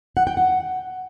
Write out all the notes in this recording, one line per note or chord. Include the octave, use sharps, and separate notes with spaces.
F#5
G5
F#5